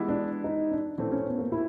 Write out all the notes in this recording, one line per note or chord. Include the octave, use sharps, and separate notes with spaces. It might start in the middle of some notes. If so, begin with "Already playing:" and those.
Already playing: E3 G#3 B3 E4 G4
D4
D#4
D4
A2 E3 A3 C4 D4
C#4
B3
A#3
E4